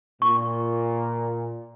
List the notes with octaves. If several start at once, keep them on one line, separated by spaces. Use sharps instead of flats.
A#2 C#6